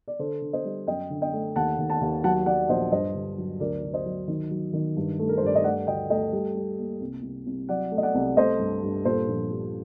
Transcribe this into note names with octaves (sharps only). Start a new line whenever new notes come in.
D5
D3 A4 C5
D3
C5 D#5
G3
F#2 D#5 G5
D3
D#5 G5
A3
D#2 F#5 A5
D#2
F#5 A5
D#2
F#3 F#5 A5
F#3 D5 F#5
A#1 C5 D#5
G2 C5 D#5
D3
F#3
D2 A#4 D5
D2
C5 D#5
F#3
D#3
F#3
D#3
G2
A3
A#4
C5
G2 D5
D#5
A3 D5 F#5
D2 D#5 G5
A3 D#5 G5
G3
G3
A#3
C2
C2
C2
F#3 D5 F#5
A3
D#5
D5 F#5
C2
A3 C5 D#5
G2
G2
A#2 A4 C5
A#1
G3